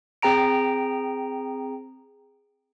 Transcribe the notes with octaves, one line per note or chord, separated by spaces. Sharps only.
C4 G#4 G5 A#5 D7